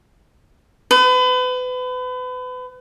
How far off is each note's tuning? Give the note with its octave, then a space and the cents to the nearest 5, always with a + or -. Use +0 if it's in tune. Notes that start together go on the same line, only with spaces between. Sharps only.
B4 +35